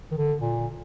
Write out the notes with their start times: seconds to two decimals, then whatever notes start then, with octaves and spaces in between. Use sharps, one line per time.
0.11 D#3
0.17 D3
0.41 A#2